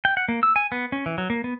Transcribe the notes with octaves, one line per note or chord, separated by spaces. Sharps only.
G5
F#5
A#3
E6
G#5
B3
C#4
E3
F#3
A#3
B3